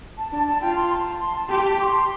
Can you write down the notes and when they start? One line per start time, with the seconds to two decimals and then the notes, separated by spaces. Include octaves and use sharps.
0.18 A5
0.32 D4 A5
0.47 A5
0.62 F4 G5
0.76 C6
0.91 C6
0.94 A5
1.20 C6
1.35 A5
1.50 G4 C6
1.64 A5
1.79 D6
1.83 C6